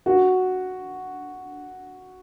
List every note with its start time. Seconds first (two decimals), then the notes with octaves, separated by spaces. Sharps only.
0.06 F#4